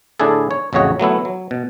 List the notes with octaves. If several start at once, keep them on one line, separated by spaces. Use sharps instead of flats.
A2 D3 D4 E4 G#4 A4
C#5
A1 F2 C#3 F#4 C#5 D#5
F#3 A3 B3 E4
F#3
B2